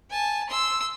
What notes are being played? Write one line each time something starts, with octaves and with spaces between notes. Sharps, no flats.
G#5 A5
C6 E6